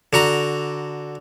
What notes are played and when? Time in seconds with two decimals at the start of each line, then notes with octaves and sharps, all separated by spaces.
0.13 D3 F#4 A#5